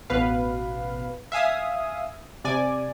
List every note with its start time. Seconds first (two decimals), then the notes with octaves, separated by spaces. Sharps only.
0.10 A1 B2 B4 F5
1.32 E5 F5 G#5 D#6
2.44 C3 D5 G#5